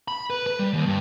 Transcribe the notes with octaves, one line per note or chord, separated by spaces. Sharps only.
B5
B4
B4
G3
D#2
G2